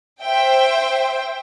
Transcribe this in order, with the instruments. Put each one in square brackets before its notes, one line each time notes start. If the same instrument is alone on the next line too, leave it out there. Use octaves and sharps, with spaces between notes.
[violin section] C5 E5 G5